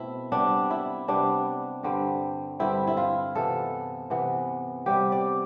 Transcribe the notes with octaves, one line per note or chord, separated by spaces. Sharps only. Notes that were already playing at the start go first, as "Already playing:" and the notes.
Already playing: B2 A3 C4 E4
C3 G3 B3 D4
E4
C3 G3 B3 D4
G2 D3 G3 C4
G2 D3 G3 C4 E4
E4
F4
C3 E3 B3 A4
C3 E3 B3
C3 G3 B3 G4
D5